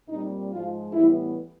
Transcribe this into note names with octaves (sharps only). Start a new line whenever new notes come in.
A#2 G3 C4 D#4
G#2 F3 G#3 F4
A2 E3 G3 B3 E4